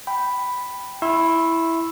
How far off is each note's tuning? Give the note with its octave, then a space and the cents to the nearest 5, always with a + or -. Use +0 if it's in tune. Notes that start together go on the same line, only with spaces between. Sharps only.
G5 -5 B5 +5
E4 +0 C6 +40 E6 +0